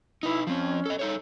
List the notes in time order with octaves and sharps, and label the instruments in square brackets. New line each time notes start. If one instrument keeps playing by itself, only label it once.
[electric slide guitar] D#4 B4 [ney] E4
[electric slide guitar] F3 C4 [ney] C#4
[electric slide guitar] A4 D#5
D#4 A4 C#5